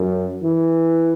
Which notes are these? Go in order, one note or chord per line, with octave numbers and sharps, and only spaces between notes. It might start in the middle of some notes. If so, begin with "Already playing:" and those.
Already playing: F#2
E3